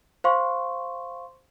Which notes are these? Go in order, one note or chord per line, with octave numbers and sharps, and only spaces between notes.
C5 F5 C6 C#6